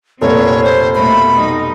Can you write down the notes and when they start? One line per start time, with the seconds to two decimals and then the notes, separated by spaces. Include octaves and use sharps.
0.21 F1 A#2 C4 C#5
0.64 C5
0.95 B2 A3 A#3 B5
1.34 G3 D#4